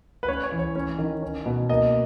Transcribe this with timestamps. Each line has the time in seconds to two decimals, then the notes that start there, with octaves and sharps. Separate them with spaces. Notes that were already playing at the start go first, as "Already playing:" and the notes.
0.23 B4
0.28 C#4 C#5
0.43 C#5
0.52 E3
0.59 C#5
0.75 C#4
0.98 D#3
1.23 C#4
1.46 B2
1.69 A#3 D#5